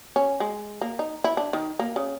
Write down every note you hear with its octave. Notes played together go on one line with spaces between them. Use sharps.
C#4
G#3
A#3
D#4
E4
D4
D#3
A#3
C#3